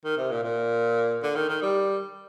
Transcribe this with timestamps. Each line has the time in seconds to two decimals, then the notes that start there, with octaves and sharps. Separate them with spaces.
0.04 D#3
0.17 C3
0.31 A#2
0.43 A#2
1.23 D3
1.35 D#3
1.48 D#3
1.62 G3